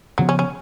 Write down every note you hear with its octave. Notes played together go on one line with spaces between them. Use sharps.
C#3 F3 F#3 B3
C#4
C#4